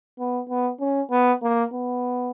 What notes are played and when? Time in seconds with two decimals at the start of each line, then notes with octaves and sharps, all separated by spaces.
0.19 B3
0.49 B3
0.80 C#4
1.11 B3
1.42 A#3
1.73 B3